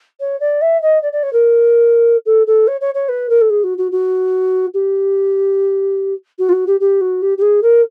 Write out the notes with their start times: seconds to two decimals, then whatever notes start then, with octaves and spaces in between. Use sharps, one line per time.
0.20 C#5
0.40 D5
0.61 E5
0.82 D#5
1.02 D5
1.13 D5
1.23 C#5
1.33 A#4
2.26 A4
2.47 A4
2.67 C#5
2.81 C#5
2.94 C#5
3.09 B4
3.29 A#4
3.41 A4
3.50 G#4
3.64 F#4
3.78 F#4
3.92 F#4
4.74 G4
6.39 F#4
6.49 F4
6.52 F#4
6.67 G4
6.80 G4
7.01 F#4
7.22 G4
7.38 G4
7.42 G#4
7.62 A#4